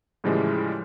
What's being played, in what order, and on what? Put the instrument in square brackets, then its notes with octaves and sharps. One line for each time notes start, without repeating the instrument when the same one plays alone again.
[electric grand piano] A2 C#3 E3 F3 G3 G#3